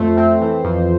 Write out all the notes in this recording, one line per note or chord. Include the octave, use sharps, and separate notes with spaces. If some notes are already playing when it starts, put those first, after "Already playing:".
Already playing: F2 A3 C5
C4
E3
F2